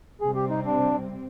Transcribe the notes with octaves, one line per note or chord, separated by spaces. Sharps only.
C3 G3 C4 G#4
G4
D#4
D4